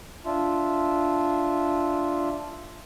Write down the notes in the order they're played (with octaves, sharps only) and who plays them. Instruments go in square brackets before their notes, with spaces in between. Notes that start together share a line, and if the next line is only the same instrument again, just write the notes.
[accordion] D4 F4 E5